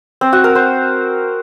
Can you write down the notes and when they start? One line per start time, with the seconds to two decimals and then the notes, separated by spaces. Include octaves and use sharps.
0.21 C4
0.33 F#4
0.44 A#4
0.55 C5